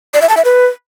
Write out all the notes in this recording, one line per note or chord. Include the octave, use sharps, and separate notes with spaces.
D5
E5
A5
E5
B4